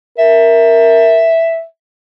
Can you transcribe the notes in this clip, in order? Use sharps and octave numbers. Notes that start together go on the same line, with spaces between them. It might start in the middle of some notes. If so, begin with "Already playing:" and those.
A#4 E5